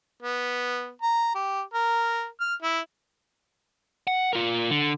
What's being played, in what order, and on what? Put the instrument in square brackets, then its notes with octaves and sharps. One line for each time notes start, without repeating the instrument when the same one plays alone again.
[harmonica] B3
A#5
G4
A#4
F6
E4
[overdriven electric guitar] F#5
F4 A#4
D3